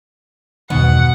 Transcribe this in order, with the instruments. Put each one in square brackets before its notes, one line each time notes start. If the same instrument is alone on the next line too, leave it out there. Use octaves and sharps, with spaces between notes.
[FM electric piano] E2 G2 D#3 [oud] B2 [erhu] F#5